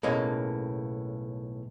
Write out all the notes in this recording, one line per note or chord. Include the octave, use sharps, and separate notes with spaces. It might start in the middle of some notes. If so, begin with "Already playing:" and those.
B1 A2 C#3 A#3 C#5 D#5